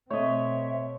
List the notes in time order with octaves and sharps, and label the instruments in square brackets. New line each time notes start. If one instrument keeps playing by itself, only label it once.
[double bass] B2 C4 [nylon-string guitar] A3 D#5 [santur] C#5 [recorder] E5